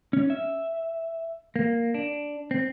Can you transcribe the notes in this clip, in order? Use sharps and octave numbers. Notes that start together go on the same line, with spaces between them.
C#4
E5
A#3
D4
C4